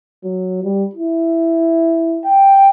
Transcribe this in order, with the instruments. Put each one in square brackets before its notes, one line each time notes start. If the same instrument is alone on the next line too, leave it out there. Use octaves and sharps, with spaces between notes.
[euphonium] F#3
G3
E4
[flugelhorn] G5